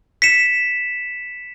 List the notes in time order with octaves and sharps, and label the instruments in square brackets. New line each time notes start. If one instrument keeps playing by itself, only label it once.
[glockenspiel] B6 C#7 E7